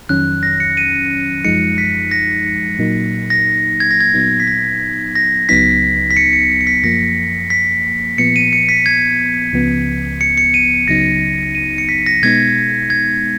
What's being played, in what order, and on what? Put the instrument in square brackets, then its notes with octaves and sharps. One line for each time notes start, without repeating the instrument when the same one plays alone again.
[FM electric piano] F2 D#3 F#3 C#4 [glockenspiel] F#6
[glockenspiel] A#6
C#7
D#7
[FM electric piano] F#2 F3 G#3 D#4 [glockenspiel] C#7
[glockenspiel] B6
A#6
C#7
[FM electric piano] A#2 F#3 A#3 D#4
[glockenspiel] A#6
G#6
A#6
G#6
[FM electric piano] A#2 F#3 B3 D#4
[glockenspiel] B6
A#6
A#6
[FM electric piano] C#2 C#3 F#3 B3 D#4 [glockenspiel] B6
[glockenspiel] B6
C#7
C#7
C#7
B6
[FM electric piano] F#2 F3 A#3 [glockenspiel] A#6
[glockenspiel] B6
[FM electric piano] A#2 F3 B3 [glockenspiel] C#7
[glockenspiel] D#7
C#7
B6
G#6
[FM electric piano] C#2 C#3 F3 B3
[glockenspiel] C#7
C#7
D#7
[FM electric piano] C#2 C#3 F#3 B3 D#4 [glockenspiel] A#6
[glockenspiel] D#7
C#7
B6
A#6
[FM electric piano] B2 G#3 B3 D#4 [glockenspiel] G#6
[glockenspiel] G#6